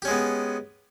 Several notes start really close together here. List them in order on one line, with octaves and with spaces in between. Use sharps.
G4 C#4 G#3 B3